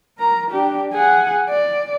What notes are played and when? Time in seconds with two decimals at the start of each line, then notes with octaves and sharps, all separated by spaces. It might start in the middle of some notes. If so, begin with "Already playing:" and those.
0.18 A#4 A#5
0.51 D4 G4
0.93 G#4 F#5
1.50 D5